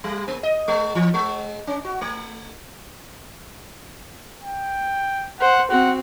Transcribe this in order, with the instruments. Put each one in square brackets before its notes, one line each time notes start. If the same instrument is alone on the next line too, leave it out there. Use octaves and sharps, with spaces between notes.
[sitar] G3
A#3
D#5
G#3
E3
G#3
C#4
F#4
A3
[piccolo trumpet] G5
[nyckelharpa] C5 [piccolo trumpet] F#5
[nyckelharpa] C4 F#4 [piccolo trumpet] F#5